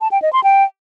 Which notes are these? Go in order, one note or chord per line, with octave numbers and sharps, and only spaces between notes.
A5
G5
D#5
C6
G5